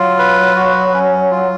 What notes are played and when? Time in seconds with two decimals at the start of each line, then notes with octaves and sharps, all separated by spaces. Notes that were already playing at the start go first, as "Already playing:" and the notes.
Already playing: F#3 F4
0.18 B4
0.56 F#4
0.94 C#4
1.31 F4